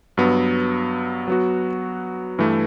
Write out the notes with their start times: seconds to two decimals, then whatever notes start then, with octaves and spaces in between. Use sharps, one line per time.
0.17 G2 F#3 B3
1.28 F#3 B3 F#4
2.38 G2 E3 A3